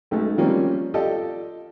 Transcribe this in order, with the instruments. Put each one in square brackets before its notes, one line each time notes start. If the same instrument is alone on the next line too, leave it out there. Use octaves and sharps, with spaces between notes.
[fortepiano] B1 G#3 A3
D#3 F3 G3 A#3 C4 C#4
F4 G4 A4 D5 D#5